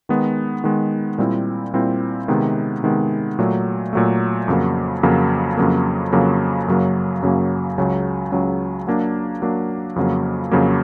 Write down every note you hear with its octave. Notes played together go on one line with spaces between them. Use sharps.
D#3 G#3 B3
D#3 G#3 B3
A#2 G3 C4 E4
A#2 G3 C4 E4
C3 D#3 G#3 B3
C3 D#3 G#3 B3
A#2 F#3 A3
A#2 F#3 A3
F2 C#3 F#3 A#3
F2 C#3 F#3 A#3
F2 C#3 F#3 A#3
F2 C#3 F#3 A#3
F#2 C#3 F#3 A#3
F#2 C#3 F#3 A#3
C#2 C#3 F#3
C#2 C#3 F#3
F#3 A#3 D4
F#3 A#3 D4
F2 C#3 F#3 A#3
F2 C#3 F#3 A#3